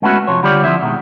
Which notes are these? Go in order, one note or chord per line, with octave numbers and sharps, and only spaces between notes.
G#3 A3 B3 C#4 E4 F#4
F2 C3 F3 C#5
D3 G3 F4 G4 C#5 D5
D3 F3 C4 E4 E5
B2 D3 D#3 G#3